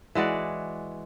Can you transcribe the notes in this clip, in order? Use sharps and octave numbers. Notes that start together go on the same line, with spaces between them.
E3 G#3 F#4 D5